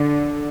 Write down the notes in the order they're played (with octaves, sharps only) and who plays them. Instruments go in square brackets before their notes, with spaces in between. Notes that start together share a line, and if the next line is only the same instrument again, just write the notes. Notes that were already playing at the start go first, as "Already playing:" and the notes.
Already playing: [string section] D3